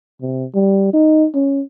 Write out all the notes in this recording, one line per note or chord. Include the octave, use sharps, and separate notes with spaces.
C3
G3
D#4
C#4